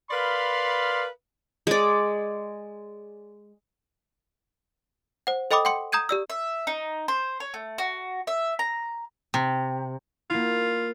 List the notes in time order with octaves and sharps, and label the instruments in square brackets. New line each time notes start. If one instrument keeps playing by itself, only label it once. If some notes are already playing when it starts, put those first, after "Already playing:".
[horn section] A#4 B4 D5 F5 B5 C6
[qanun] G#3 D5
[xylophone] C5 F#5
A4 D#5 G5 B5 D6 D#6
F#5 G5 C6 C#7
A#5 D#6 G6 G#6 D#7
G4 D5 E6
[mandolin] E5
D#4
C5
C#5
A3
F#4
E5
A#5
[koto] C3
[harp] A#3 E4 [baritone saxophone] F4